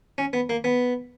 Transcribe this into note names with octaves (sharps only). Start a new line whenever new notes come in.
C#4
B3
A#3
B3